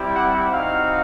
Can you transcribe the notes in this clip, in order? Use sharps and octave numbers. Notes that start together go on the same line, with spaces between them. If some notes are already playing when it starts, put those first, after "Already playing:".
Already playing: G3 C4 E4 G4
F#5
C4 D#4 F#4 F5